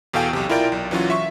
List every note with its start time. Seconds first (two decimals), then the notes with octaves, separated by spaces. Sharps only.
0.14 E2 B2 A4 F5 G5 G#5
0.33 B1 C3
0.49 E4 F4 A#4 D5 G5
0.72 B1
0.91 E3 F#3 C#4 F4 F#4
1.10 E5 C#6